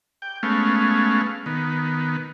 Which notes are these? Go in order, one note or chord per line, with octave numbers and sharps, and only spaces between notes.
G5
G#3 A3 B3 C#4 F5
D#3 B3